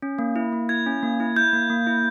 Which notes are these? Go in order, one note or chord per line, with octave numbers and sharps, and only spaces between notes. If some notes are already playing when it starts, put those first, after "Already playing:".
C#4
A#3
E4
A#3
E4 G#6
C#4
A#3
E4
E4 G6
A#3
A#3
E4